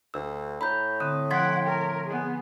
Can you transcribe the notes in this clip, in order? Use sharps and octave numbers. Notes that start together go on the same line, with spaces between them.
D2 E6
A2 A#5 B5 G6
D3 C4 D#6
F3 F#5 G5 C6 G#6 B6
A#4
B3 G#4